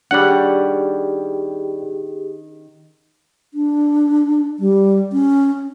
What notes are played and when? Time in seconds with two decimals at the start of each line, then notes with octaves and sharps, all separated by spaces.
0.11 D#3 G3 C#4 D4 G4 G#4 F#5
3.54 D4
4.59 G3
5.12 C#4